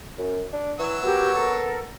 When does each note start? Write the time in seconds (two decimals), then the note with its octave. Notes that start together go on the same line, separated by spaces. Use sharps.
0.18 F#2
0.53 D4
0.79 E3 F#3 C#5 E6
1.03 B3 F#4 G4 A#4
1.34 A4 A#4